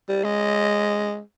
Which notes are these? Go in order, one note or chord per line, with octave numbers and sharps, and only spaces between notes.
G3
G#3